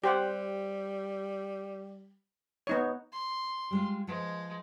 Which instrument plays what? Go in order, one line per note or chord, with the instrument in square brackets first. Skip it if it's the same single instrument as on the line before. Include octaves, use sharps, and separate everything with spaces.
[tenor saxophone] G3 [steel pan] G4 C5 F#5
[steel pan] B3 D#4 C#5
[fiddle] C6
[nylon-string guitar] G3 G#3 F4
[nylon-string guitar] F3 B4 [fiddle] G#3